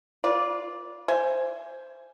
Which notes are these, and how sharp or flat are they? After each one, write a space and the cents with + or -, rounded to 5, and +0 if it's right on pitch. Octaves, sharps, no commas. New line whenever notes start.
F4 +0 B4 -40 D5 -10
C5 +0 E5 +30 G#5 +0